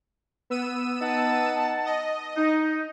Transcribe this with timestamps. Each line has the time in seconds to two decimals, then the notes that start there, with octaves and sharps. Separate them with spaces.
0.50 B3 E6 D#7
1.01 D#4 F#5 A5
1.86 D#5
2.37 D#4